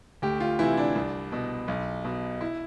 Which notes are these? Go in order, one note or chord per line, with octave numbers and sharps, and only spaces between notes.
D2 G4
F4
C3 E3 E4
D4
C2
B2
B1
B2
E4